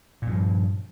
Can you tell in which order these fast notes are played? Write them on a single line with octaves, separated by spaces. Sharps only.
A#2 G2 F3